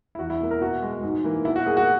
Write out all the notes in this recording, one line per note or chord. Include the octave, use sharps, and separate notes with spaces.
E4
E2 F#4
E4
B2 A#3
A#4
B2 F#4
G#3
G#2
E3 A#3
B2 E4
F#4
A#3 G#4
F#4